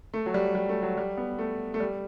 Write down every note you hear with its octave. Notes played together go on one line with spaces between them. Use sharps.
A3
F#3
G3
G3
A3
F#3
G3
B3
A3
A3
G3